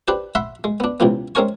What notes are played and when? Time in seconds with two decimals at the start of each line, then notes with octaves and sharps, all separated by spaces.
0.08 D4 G4 B4 C5
0.35 E5 F#5 B5 C6
0.64 G#3
0.80 B3 D4
1.00 C#2 C3 E3 B3
1.35 G#3 C4 C#4 A#4 G#5 C#6